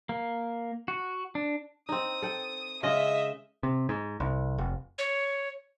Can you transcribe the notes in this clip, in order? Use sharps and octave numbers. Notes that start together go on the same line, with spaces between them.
A#3
F#4
D4
C4 D#4 D#6
A4 G5
C#3 G#3 D#5 E5
C3
G#2
C2
F1
C#5